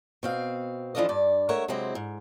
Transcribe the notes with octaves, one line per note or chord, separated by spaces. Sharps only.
B2 C4 F5
E3 F3 D4 F4 A4 D#5
G2 D5
G#3 A3 A#4 C#5 E5 F#5
C3 F#3 G#3 C4 E4
G#2